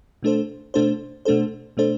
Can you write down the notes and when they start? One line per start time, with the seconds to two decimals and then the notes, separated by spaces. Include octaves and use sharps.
0.23 B2 A3 D4 A4 C5
0.74 B2 A3 D4 A4 C5
1.25 B2 A3 D4 A4 C5
1.77 B2 A3 D4 A4 C5